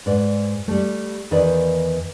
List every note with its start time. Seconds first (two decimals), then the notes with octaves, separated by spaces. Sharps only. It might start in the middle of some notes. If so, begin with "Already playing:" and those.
0.06 G#2 B4 D5
0.68 G3 A3
1.31 E2 D#3 D#4 B4 D5 E5